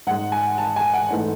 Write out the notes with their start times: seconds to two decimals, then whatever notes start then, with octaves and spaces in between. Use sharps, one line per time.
0.07 G#2 G#3 F#5
0.32 G#5
0.58 A5
0.76 G#5
0.94 F#5
1.10 G#2 E3 A3